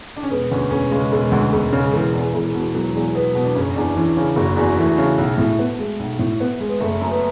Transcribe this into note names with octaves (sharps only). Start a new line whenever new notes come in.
D4
C#4
E1 B3
D2 C#4
E1 C#4
C#3 G#3
E1
D2
E1
C#3
E1 E3
E2
E1 E3
B2
E1 F#3
E2
E1 B3
B2
D4
F#1 C#4
E2 D4
E3 C#4
C#3
F#1 F#4
E2 F#4
E3 A3
C#3
B1
A2
B3
G#3
B1
A2
B3
G#3
B3
F#1 A3
F#2
B3